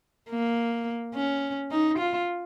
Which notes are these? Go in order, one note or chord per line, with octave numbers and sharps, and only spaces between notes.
A#3
C#4
D#4
F4